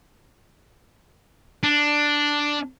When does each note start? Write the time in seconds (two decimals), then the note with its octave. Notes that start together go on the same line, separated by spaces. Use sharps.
1.63 D4